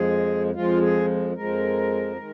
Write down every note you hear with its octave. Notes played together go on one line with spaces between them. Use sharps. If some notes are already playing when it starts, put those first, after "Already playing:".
Already playing: F2 F3 G#3 G#4
F2 F3 G#3 F4
G#4
F2 F3 G#3 A#4
D#3 G#3